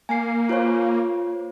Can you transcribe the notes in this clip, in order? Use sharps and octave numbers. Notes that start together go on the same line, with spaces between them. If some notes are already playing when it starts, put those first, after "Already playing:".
A#3 G#5 C7
F4 C5 C#5